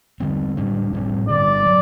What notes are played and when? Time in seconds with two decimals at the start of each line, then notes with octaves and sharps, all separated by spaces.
0.20 D3 G3 C4
0.57 A2 G3 D4
0.93 A2 G3 C4
1.29 G2 D3 G3 D5
1.66 F#3